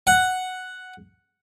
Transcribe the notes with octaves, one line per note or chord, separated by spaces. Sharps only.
F#5